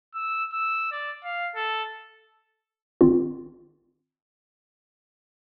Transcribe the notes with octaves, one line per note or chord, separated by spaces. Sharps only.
E6
E6
D5
F5
A4
G#1 C4 F4